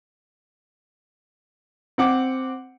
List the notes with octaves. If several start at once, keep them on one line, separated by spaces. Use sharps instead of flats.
C4 F#5 D6